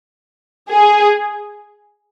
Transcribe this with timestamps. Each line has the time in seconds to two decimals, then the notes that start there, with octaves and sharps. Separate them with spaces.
0.70 G#4